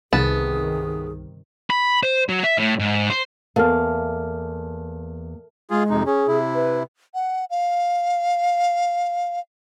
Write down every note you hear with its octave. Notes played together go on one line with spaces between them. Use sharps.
G1 C2 C3 D#3 B3 G#4 A5
B5
C5
F#3
E5
A2
G#2
C5
E2 A3 A#3 A#4 F5 F6
G#3 F4 G#4
F2 C3 D#4
C#4 G#4
C3 E4
B4
F#5
F5